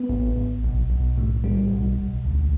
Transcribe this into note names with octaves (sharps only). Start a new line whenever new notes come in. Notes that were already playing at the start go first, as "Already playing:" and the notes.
Already playing: B3
A1
A1
B1
B1
A2
G3
B1
B1
D2